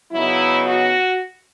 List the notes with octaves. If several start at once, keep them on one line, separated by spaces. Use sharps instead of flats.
C#3 F#3 B3 D#4 E4
F#4